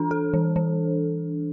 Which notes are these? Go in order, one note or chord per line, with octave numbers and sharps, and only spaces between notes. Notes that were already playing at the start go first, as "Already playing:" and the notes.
Already playing: E3 D4 A4
A4
E3
E3